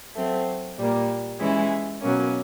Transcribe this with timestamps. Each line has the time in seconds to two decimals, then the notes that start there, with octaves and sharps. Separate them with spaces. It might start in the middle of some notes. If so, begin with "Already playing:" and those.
0.16 F#3 A3 C4
0.78 A#2 G3 A#3
1.39 E3 G#3 C#4 E4
2.01 B2 F#3 A#3 C#4